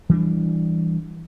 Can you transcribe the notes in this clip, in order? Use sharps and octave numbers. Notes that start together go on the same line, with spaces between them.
E3 G3 C4 D4